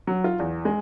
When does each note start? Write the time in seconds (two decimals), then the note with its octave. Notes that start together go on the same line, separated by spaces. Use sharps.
0.07 F#3
0.24 F4
0.39 E2
0.65 G#3